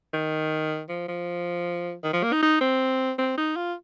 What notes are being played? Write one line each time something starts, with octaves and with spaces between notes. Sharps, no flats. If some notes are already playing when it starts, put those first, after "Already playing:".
D#3
F3
F3
D#3
F3
A#3
D#4
D#4
C4
C4
D#4
F4